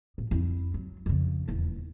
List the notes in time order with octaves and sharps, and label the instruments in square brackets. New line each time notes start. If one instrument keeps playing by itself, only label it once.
[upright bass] A#2
F2 E4
F#3
F2 C#3
D#1 E2